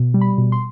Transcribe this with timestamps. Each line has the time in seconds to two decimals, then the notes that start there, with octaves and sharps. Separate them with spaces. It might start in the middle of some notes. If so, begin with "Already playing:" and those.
Already playing: B2
0.14 G3
0.21 B5
0.38 B2
0.52 C6